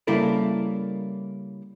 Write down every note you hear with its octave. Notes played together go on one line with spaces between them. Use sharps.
C#3 G3 A#3 E4 A4 A#4